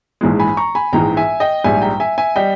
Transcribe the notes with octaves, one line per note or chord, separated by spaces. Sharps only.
A#1 G#2 E3 G#3
G#5 B5
A#5 C#6
G#5 B5
A#1 G#2 E3 G#3 G5 A#5
E5 G#5
D#5 G5
A#1 G#2 G3 E5 G#5
G5 A#5
E5 G#5
E5 G#5
G3 D#5 G5